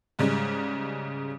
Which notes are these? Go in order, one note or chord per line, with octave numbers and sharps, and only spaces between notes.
G#2 C#3 G3 G#3